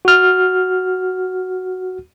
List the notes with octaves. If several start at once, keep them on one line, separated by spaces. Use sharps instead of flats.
F#4 F6